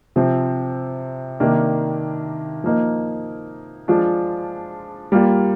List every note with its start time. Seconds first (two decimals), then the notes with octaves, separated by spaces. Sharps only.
0.16 C3 F3 C4
1.40 C3 D#3 A#3 D4
2.64 F3 A#3 D#4
3.88 F3 G#3 D4 F4
5.12 G3 A#3 F4